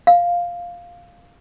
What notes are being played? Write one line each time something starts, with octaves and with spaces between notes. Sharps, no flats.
F5